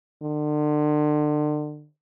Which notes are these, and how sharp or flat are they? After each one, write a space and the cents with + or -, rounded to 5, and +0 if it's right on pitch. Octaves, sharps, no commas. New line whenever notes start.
D3 +35